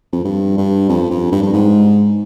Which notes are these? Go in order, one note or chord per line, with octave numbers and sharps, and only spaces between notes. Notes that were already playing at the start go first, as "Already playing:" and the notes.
F2
G2
G2
F2
F2
G2
G2
G#2